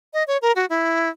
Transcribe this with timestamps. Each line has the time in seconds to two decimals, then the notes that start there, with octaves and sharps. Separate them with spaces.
0.14 D#5
0.27 C#5
0.42 A#4
0.56 F#4
0.70 E4